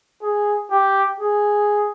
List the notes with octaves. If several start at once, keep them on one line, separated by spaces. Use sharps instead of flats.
G#4
G4
G#4